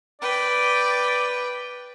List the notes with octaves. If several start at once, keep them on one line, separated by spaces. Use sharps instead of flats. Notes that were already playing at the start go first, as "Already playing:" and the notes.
B4 D5 G5